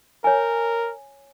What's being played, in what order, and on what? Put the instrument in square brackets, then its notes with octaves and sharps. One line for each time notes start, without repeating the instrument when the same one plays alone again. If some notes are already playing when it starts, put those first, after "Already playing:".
[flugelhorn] A#4 [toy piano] C#5 G#5